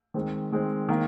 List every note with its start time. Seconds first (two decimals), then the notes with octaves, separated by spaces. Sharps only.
0.14 D#3 G#3 C4
0.52 D#3 G#3 C4
0.89 D#3 A#3